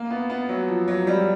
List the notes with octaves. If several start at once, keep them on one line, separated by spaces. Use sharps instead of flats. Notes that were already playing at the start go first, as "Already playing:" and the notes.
Already playing: A#3
B3
B3
F#3
F3
F#3
G3